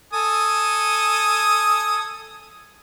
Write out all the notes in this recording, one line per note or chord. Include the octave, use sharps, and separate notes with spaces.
A4 G#5 D#6